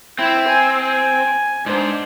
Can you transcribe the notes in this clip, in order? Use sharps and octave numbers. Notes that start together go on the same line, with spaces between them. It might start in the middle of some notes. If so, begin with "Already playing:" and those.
C4 E4
G#5
G#5
G#2 D4 C5